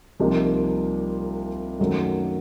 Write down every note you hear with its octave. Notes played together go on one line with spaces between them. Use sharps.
C2 C3 F3 A#3 D#4
F#2 D#3 F#3 A3